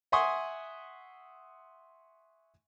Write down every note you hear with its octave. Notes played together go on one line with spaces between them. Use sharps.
E5 F#5 G#5 C6 C#6 D#6